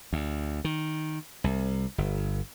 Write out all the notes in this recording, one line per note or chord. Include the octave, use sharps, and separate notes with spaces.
D2
D#3
C2
G1